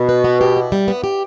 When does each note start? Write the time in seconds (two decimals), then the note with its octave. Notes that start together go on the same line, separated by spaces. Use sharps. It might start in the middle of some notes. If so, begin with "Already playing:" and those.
Already playing: B2
0.09 B4
0.24 B3
0.41 G4
0.57 E4
0.72 G3
0.88 B3
1.04 G4